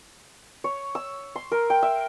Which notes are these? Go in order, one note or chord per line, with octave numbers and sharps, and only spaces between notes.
C#5
E6
C6
A#4
G5
E5